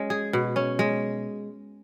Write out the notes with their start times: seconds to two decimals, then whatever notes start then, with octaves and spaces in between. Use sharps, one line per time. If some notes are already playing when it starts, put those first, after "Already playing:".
Already playing: G#3 C#4
0.10 G#4
0.33 B2
0.56 C#4
0.79 G#3